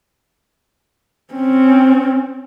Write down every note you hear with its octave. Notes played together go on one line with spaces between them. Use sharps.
C4 C#4